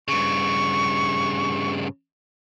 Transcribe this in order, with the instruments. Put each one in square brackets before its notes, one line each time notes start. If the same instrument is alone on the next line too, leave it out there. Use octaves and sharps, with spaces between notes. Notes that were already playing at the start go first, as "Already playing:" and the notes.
[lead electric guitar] G2 C#3 [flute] C#6